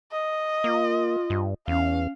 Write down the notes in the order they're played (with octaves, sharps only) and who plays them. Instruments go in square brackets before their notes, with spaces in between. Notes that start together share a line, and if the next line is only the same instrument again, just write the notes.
[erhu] D#5
[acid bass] A#3 [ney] F4
[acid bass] G2
[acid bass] E2 [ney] C#4 [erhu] F5